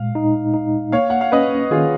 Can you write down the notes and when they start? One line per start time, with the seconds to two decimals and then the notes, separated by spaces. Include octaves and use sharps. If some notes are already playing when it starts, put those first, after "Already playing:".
Already playing: A#2 G#3 F5
0.15 D#4
0.54 D#4
0.92 A#3 C#5 F5
1.10 F#5
1.21 F5
1.32 C#4 B4 D#5
1.71 D#3 F4 G#4